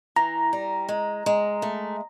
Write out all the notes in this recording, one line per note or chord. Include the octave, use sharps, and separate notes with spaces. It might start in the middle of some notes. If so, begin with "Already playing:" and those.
E3 A#5
G3
G#3
G#3
A3